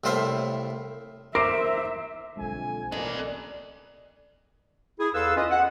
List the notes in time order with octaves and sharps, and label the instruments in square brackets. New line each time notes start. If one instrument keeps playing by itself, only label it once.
[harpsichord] C2 A2 F4 C5 E5
[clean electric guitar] A#4 C5 [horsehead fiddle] E5 [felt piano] D6 D7
[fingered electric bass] B1 G#3 [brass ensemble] F2 D3 G#5
[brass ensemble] A1 A#3 [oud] D4 [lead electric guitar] A4 D#5
[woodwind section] E4 G#4
E2 A4 B4 F5 C6 E6
C#4 F4 B4 D#5
F#5